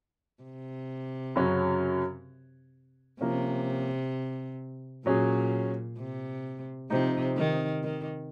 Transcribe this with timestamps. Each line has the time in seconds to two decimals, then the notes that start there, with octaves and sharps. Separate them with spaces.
0.43 C3
1.36 F#2 C#3 F#3 C#4 F#4
3.20 C3 F3 A#3 C#4
5.06 A#2 F#3 C#4 G#4
5.98 C3
6.90 C3 F3 C4 D#4
7.37 D#3
7.83 D#3